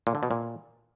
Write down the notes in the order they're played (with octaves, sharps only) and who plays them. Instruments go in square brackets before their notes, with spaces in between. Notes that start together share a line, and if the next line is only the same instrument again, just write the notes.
[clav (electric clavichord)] A#2
D3
B2
A#2